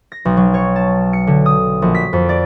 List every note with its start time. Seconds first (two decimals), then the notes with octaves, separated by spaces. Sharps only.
0.12 A#6
0.25 B1
0.37 F#3
0.54 C#5
0.76 A5
1.13 C#7
1.27 D3
1.46 D#6
1.82 A#1
1.95 B6
2.13 F2
2.29 D5